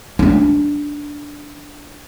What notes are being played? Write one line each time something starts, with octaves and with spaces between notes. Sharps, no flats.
D4 D#4